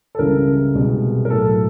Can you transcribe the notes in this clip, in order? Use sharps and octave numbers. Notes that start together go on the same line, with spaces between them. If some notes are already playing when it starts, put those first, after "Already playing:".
A4
C#2 C#3 E3 G3 A#4
C2 B2 G#3
A#4
A2 F#3 A4